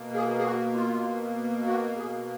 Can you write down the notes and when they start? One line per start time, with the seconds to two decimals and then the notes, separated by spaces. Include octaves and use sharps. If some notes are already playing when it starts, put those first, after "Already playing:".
Already playing: B2 A#3
0.14 G#4
0.38 G#4
0.44 F#4
0.75 F4
1.67 F#4
1.97 G#4